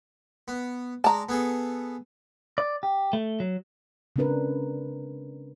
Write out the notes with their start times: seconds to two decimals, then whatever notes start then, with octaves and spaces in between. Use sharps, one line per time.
0.48 B3
1.04 G#3 D5 A5 A#5
1.29 B3 G#4 A4
2.58 D5
2.83 G4
3.13 A3
3.40 F#3
4.16 C#3 G#3 C4 D4 A#4 B4